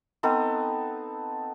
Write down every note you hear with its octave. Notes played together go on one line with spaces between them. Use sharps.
B3 C4 D#4 A4